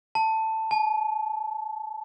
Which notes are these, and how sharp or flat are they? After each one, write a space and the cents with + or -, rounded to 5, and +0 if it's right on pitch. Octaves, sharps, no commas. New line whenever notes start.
A5 +10
A5 -45